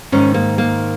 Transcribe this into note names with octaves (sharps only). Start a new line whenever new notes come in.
G#2 D#3 C#4
A#3
A#3